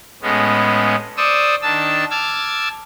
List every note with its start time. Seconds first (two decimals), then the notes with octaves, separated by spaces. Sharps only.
0.22 A2 G#3 B3 C#4
1.17 C5 D5 C#6 D#6 E6
1.62 D#3 D4 A5 E6
2.11 A5 D6 E6 F6 G#6